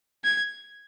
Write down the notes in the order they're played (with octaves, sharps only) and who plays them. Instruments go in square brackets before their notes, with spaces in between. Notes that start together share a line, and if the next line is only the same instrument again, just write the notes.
[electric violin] G#6